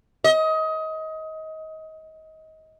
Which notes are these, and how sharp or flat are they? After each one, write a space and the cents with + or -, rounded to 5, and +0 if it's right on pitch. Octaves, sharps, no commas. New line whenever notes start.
D#5 +25